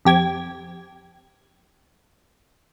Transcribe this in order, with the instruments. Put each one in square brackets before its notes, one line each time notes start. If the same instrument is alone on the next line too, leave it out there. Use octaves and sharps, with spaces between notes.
[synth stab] F2 G4 G#6